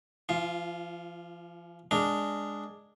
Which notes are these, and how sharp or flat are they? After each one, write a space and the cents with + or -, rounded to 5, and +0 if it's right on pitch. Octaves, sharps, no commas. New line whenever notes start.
F3 -40 F4 +0
G#3 +0 D4 +0 A#4 -10